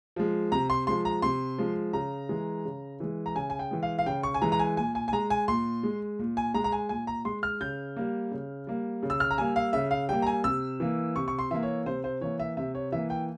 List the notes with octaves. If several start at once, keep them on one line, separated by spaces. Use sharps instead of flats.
F3 G#3
C3 A#5
C6
F3 G#3 C6
A#5
C3 C6
F3 G#3
C#3 A#5
E3 G#3
C#3
E3 G#3
A#5
C#3 G#5
G#5
G5
E3 G#3
F5
F5
C#3 G5
C#6
G#5
E3 G#3 A#5
A#5
G#5
A#2 G#5
G#5
G#5
G#3 A#5
G#5
A#2 C6
G#3
A#2
G#5
G#3 A#5
A#5
G#5
A#2 G#5
A#5
G#3 C6
F6
C#3 G6
G3 A#3
C#3
G3 A#3
C#3
E6
F6
A#5
G3 A#3 G#5
F5
C#3 E5
F5
G3 A#3 G5
A#5
G#5
C3 E6
E3 A#3
C3 C#6
C#6
C6
E3 A#3 E5
C#5
C3 C5
C5
E3 A#3 C#5
E5
C3 E5
C#5
E3 A#3 E5
G5